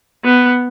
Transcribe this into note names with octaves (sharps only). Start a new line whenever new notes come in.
B3